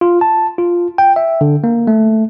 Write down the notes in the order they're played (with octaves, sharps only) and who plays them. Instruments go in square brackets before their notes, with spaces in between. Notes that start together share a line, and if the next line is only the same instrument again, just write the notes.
[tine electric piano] F4
A5
F4
G5
E5
D3
A#3
A3